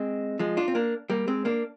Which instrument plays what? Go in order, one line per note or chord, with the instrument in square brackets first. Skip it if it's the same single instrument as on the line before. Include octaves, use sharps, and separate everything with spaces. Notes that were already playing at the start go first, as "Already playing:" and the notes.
Already playing: [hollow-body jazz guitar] G#3 C4
F3 G#3
D4 F4
C4
A#3 D4
G3 A#3
G#3 C4
A#3 D4